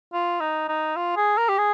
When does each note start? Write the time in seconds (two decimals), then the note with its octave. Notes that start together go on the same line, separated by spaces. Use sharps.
0.13 F4
0.41 D#4
0.69 D#4
0.96 F4
1.16 G#4
1.38 A#4
1.49 G4
1.58 G#4